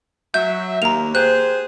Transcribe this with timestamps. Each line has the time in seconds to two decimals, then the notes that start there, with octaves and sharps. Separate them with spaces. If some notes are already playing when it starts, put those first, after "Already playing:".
0.34 F#3 E5 G6
0.82 D#2 A#3 A#5 F7
1.15 G4 G#4 C5 F#6